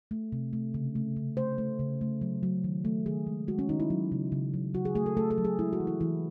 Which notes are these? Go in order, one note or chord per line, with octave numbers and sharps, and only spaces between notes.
A3
C3
A3
C#3
A3
C#3
A3 C5
A3
C#3
A3
F#3
F#3
D#3
A3
D#3 G#4
G#3
G#3 F#4
C#4
D#3 D#4
E4
F#3
C#3
C#3
F#3
F#3 F#4
G#4
A3 G#4
A4
A3 A4
A4
F#3
G#4
G#3 E4
F#4
E3
E4
E3 E4